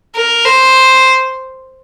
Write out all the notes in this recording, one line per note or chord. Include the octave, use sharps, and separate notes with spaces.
A#4
C5